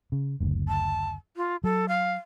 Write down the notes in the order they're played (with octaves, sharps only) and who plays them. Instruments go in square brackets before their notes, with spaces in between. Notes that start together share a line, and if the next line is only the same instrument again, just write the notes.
[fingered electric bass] C#3
F#1 D2
[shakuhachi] A5
F4
[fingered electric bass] F#3 [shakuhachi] A4
[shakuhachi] F5